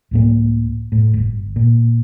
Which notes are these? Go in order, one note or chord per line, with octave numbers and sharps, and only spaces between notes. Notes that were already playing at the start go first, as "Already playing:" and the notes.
C#2 A2 A#3
A2
D1 G1
A#2